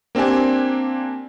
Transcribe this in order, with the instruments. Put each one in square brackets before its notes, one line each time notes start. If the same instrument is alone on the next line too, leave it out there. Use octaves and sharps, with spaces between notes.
[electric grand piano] A#3 C4 D4 G4 G#5